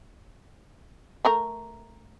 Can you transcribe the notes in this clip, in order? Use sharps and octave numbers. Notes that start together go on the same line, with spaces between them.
A3 A#4 A#5